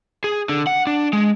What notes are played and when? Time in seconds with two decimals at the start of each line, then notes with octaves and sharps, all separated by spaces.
0.24 G#4
0.49 D3
0.67 F#5
0.87 D4
1.13 G#3